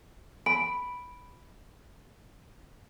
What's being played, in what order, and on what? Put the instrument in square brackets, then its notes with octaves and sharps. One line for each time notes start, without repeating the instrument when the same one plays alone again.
[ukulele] B5 [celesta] D7